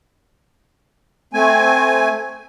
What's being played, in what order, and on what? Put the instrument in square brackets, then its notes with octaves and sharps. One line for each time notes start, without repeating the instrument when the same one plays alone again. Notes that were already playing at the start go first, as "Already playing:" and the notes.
[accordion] A3 C4 G#5